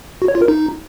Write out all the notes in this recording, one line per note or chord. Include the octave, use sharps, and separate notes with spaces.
F#4
C#5
F4
A#4
D#4